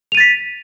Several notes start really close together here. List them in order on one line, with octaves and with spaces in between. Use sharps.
F7 D#7 A6 B6